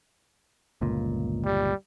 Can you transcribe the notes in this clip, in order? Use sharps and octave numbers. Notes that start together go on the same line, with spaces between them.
G1 C#2 A#2
G3